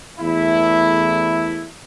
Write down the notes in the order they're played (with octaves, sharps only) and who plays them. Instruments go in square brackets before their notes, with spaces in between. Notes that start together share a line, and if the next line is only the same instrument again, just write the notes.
[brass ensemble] E2 A3 E4